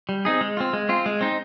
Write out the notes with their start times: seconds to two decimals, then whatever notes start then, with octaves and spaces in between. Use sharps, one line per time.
0.09 G3
0.25 C4 D#4 G#4
0.41 G#3
0.57 C4 F4
0.73 G#3
0.89 C4 F4
1.06 G#3
1.21 C4 D#4